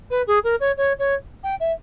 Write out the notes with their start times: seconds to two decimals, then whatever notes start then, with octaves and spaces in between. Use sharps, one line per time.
0.10 B4
0.27 G#4
0.43 A#4
0.60 C#5
0.77 C#5
0.99 C#5
1.43 G5
1.60 E5